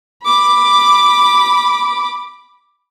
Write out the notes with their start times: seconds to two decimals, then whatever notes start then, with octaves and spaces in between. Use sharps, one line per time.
0.24 B5 D6